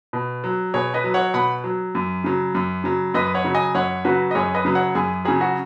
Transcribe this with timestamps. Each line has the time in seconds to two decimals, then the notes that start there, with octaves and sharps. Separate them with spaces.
0.13 B2
0.44 F#3
0.74 B2 G#4 C#5
0.94 B4 D#5
1.04 F#3
1.14 C#5 F#5
1.34 B2 F#5 B5
1.64 F#3
1.95 F#2
2.24 C#3 F#3
2.55 F#2
2.84 C#3 F#3
3.14 F#2 B4 D#5
3.35 C#5 F#5
3.45 C#3 F#3
3.54 D#5 G#5
3.75 F#2 C#5 F#5
4.05 C#3 F#3 F#4 B4
4.31 D#5
4.35 F#2 G#4 C#5
4.54 B4 D#5
4.65 C#3 F#3
4.75 C#5 F#5
4.95 F#2 G#4
5.25 C#3 F#3 G#4
5.41 F#4